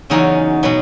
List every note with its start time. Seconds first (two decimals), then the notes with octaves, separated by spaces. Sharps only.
0.10 E2 C#3 F#3 C#4 D#4
0.63 B2 F#3 B3